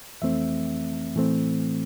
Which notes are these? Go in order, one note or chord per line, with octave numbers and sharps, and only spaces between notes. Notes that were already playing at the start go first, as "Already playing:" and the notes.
F2 E3 A3 C4 E5
A2 E3 A3 C4